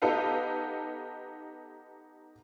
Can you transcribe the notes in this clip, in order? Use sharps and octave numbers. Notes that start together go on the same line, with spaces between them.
B3 D#4 G4 A4 B4 F5